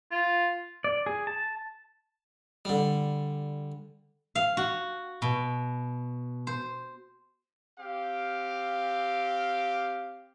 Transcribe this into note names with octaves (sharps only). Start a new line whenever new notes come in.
F4
D5
G#4
A5
D3 G3
F5
F#4
B2
C5
C4 G4 F5